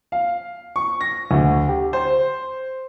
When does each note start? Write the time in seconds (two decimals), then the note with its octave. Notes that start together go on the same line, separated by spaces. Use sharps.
0.12 F5
0.76 C#6
1.01 A#6
1.31 D2
1.69 G4
1.93 C5